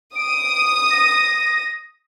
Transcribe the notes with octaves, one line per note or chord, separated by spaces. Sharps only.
D#6 D7
A#6